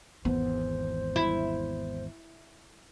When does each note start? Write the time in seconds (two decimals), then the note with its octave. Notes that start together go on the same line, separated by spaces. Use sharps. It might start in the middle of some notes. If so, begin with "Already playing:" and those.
0.25 G#1 E2 B3 C5
1.16 E4